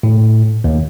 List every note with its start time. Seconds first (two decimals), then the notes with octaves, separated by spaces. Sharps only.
0.03 A2
0.64 D#2